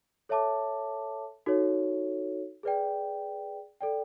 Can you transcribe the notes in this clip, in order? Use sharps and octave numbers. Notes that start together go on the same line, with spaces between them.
A4 C#5 E5 A5 D6
D#4 F#4 A4 C#5
G#4 B4 D5 G5
A4 D5 G5